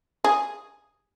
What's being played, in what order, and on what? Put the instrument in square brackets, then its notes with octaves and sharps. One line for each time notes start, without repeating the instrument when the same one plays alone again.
[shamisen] G#4